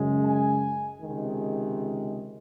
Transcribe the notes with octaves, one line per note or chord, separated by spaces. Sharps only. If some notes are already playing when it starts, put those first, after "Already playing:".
Already playing: F#2 C#3 G#3
G#5
C#2 C3 D#3 G#3